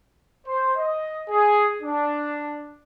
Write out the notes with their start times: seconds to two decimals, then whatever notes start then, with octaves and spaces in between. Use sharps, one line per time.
0.47 C5
0.77 D#5
1.30 G#4
1.82 D4